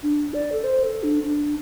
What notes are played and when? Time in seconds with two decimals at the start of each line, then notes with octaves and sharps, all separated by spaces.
0.03 D4
0.34 D5
0.52 A4
0.64 C5
0.84 A4
1.03 D4
1.23 D4